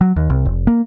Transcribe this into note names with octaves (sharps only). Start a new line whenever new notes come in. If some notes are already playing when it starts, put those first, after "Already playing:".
F#3
D#2
C2
F1
A#3